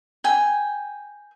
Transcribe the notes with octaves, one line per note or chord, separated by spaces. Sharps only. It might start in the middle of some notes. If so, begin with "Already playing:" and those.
G5 G#5